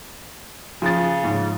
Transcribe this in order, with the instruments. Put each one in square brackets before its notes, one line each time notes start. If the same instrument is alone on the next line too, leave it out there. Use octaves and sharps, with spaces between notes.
[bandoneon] C#3 [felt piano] F3 A6
[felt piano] G#2